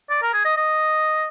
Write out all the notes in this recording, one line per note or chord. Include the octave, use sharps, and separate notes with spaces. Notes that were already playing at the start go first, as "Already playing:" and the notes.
D5
A#4
G#4
D#5
D#5